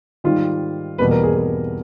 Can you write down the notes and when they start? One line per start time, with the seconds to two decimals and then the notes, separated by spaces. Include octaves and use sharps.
0.24 G#2 D#3 G3 F4
0.98 E2 B2 G3 A#3 B4
1.11 A#4
1.23 G#4
1.36 G#4